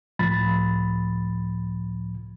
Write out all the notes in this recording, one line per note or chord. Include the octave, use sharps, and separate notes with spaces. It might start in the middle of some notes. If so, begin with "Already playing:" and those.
C#2 A2 F3 B5 A6